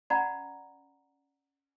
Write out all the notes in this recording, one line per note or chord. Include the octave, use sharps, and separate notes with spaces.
C#4 D5 F#5 G#5 A#5 B5